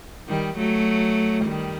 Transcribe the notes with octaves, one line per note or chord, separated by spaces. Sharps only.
D#3 G3
F#3 A3
D#3 G3